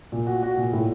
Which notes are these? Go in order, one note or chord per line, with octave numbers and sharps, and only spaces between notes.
A#2
F#4
F#4
A#2
A2